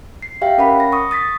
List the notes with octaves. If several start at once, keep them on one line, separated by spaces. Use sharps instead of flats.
C7
G4 E5 F5 G5
C#4 A#4 F#5 B5
A#6
C#6 D#6
D#6 A6 B6